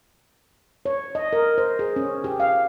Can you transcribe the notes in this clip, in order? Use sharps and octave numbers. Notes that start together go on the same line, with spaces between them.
C#5
D#5
A#4
C5
G#4
C#4
G4
F5